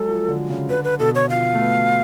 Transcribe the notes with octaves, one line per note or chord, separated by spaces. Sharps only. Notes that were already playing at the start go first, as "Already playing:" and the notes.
Already playing: F#3 G#3 A4
F3
F3
D3
C#3
D3 B4
B4
B2 A4
C#5
F3 F5
A3
B3